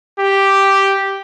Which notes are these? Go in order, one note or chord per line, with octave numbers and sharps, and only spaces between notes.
G4